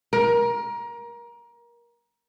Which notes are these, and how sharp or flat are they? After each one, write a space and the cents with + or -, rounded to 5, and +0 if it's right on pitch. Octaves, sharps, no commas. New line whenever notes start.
A#4 +25